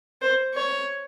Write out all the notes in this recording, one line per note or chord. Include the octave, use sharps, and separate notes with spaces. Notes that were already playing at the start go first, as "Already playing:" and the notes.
C5
C#5